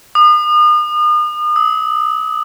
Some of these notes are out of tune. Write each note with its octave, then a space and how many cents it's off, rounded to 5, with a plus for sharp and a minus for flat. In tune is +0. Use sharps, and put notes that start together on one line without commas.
D#6 -40
D#6 +45